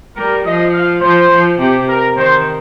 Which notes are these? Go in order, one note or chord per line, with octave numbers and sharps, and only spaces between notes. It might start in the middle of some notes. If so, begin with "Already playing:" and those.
G3 A#4
F3 D#5
F5
F3 C5
F3
C3 G4
A#4
D#3 C5